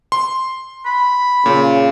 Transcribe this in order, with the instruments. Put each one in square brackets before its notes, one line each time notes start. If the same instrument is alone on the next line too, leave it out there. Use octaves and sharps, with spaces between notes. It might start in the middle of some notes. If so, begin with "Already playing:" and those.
[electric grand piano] C6
[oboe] B5
[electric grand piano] A#2 [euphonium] C#3